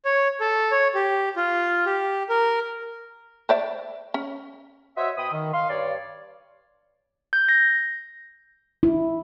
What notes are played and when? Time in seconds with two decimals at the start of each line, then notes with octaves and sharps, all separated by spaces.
0.05 C#5
0.41 A4
0.72 C#5
0.95 G4
1.36 F4
1.86 G4
2.29 A#4
3.49 C5 D5 E5
4.14 C#4
4.97 F#4 C5 C#5 D#5 E5
5.17 B2 G5 B5 D#6
5.32 D#3
5.54 F5 C6
5.70 G2 C#5 D5
7.33 G6
7.49 A#6
8.83 E4